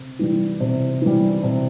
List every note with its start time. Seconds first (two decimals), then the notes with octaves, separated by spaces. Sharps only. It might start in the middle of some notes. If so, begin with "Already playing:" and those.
Already playing: C3
0.19 E3 G3
0.60 C3
1.02 E3 G3
1.43 C3